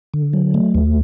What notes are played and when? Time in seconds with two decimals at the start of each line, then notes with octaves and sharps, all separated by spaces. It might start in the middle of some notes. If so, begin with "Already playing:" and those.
0.14 D3
0.33 F#3
0.54 A3
0.75 D#2